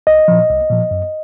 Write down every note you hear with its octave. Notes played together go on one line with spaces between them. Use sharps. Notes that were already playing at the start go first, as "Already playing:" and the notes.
C2 D#5
A#2 F3
C2
A#2 F3
F#2